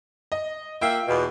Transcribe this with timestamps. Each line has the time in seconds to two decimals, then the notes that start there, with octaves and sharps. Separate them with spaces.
0.32 D#5
0.81 A#3 F4 E5 G5
1.08 E2 B2